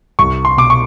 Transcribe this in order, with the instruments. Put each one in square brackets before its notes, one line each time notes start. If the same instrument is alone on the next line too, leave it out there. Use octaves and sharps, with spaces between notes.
[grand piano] C2 C#6
C6
B2 D6
C#6